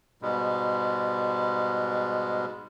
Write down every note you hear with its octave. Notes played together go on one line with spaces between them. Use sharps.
G#2 B2 G3 G#3